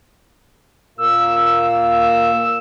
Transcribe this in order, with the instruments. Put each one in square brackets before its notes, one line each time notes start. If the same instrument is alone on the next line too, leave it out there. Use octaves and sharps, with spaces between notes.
[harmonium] A#2 A#3 [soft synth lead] E6